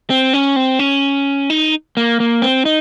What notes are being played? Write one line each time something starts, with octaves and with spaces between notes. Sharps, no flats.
C4
C#4
C4
C#4
D#4
A#3
A#3
C4
D#4